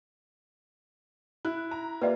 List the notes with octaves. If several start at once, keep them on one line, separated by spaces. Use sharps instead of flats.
E4 F#6
A#5
A#3 F4 G4 B4 D5 E5